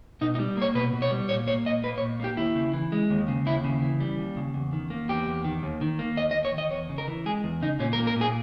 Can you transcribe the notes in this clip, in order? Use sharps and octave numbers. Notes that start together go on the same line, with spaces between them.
B2 D#4
D#4
G3
A#3 C#5
B2 B4
B2
C#5
G3
A#2 C#5
A#3 C#5
A#2 D#5
A#3 B4
C#5
A#2
A#3 G4
D#2 E4
C#3
E3
G#3
D#2
C#3
D#2 E4
C#3
E3
G3
D#2
C#3
E2
D#3
A#3
E2 G4
E2
D#3
D#2
D#3
A#3
D#2 D#5
D#5
D#2
C#5
D#3 D#5
E2 C#5
C#3
A#4
E3
G#3 G#4
E2
C#3 D#4
A#2 C#4
A#4
A#3
A#4
A#2
G#4